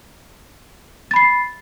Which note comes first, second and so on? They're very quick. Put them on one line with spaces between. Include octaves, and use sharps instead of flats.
A6 B5 C7